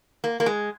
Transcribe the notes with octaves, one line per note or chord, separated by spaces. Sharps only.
A#3
A#3
G#3